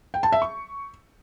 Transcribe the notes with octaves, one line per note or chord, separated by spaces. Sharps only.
G5
A5
E5
C#6